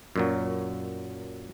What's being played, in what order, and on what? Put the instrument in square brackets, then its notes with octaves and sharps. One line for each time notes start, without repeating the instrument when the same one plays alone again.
[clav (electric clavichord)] F#2 A#2 F#3